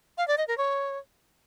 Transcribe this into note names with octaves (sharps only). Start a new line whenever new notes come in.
F5
D5
D#5
A#4
C#5